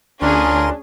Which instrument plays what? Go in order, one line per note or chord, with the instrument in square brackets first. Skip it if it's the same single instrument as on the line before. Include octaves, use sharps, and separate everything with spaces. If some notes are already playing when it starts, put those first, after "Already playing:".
[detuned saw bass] D2 [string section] C#4 G#4 [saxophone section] D4 [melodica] F4 A#4 C6